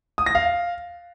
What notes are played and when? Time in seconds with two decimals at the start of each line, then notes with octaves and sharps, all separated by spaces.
0.18 D#6
0.26 A#6
0.35 F5